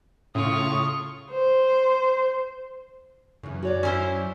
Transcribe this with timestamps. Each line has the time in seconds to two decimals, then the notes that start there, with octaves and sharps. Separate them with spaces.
0.35 A2 C#3 F4 C#6 D#6
1.31 C5
3.43 F#2 C#3 E3
3.63 F#4 C#5 D5
3.83 C#4 E4 C5